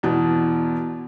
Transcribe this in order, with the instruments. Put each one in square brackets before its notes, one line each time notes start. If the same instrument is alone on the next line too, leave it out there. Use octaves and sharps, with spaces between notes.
[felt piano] E2 B2 E3